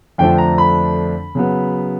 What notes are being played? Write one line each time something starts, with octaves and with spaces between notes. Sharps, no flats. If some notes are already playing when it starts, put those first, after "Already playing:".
F2 D3 F3 A3 D4 G5
A#5
B5
C#3 F#3 B3